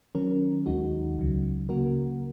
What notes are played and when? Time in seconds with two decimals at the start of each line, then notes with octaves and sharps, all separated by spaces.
0.15 D#3 F#3 C#4 A#4
0.66 D#2 D#3 G#3 D#4 F#4
1.17 C#2 C#3 F#3
1.69 C#3 A#3 F#4 A#4